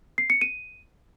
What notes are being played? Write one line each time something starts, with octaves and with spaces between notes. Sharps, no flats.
C7
C#7
D#7